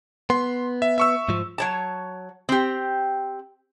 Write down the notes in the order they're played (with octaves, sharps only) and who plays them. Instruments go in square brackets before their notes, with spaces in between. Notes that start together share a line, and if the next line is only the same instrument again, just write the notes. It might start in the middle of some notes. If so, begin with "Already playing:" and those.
[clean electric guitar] B3 [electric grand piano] C6
[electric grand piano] E5
E5 C#6 E6
[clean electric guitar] G#2 F3
[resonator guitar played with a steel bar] F#3 C#5 A5
C4 G4